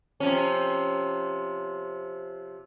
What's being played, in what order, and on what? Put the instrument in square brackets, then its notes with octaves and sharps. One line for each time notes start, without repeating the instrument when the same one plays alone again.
[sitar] C3 F3 C#4